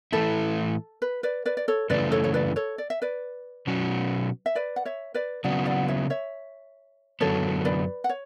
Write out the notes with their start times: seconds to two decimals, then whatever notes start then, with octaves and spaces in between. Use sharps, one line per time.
0.12 A2 E3 A3 E4 A4
1.02 B4
1.23 B4 D5
1.46 B4 D5
1.57 D5
1.68 A4 C#5
1.90 F#2 C#3 E3 A3 B4 D5
2.12 A4 C#5
2.24 C#5
2.34 B4 D5
2.56 A4 C#5
2.78 D5
2.90 E5
3.02 B4 D5
3.67 B2 F#3 C#4 F#4
4.46 E5
4.55 B4 D5
4.76 F#5
4.85 C#5 E5
5.14 B4 D5
5.44 C#3 F#3 B3 D5 F#5
5.66 D5 F#5
5.88 C#5 E5
6.10 C#5 E5
7.20 F#2 D3 F#3 B3 A4 C#5
7.65 B4 D5
8.04 F#5
8.09 C#5